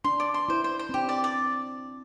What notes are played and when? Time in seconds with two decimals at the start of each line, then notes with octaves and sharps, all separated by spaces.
0.04 D4 C6
0.20 D5
0.34 C6
0.49 E4 C5
0.64 C5
0.79 C5
0.89 C4
0.94 D4 G4
1.09 D5
1.24 D5